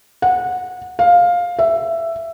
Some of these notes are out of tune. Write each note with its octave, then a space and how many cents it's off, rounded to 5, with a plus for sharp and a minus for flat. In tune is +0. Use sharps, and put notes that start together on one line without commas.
F#5 -20
F5 +10
E5 +10